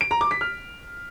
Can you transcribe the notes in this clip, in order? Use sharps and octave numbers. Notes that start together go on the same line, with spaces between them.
D7
A#5
D6
B6
F6